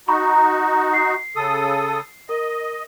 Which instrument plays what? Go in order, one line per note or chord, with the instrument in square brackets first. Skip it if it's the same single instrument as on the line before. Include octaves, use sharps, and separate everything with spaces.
[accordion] D#4 F#4 [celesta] A#5 B5 C#6
[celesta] A#5
C7
[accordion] C#3 A4 D#6
[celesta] A#4 [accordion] D#5